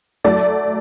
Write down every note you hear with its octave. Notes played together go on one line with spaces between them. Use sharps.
F#3 A3 D5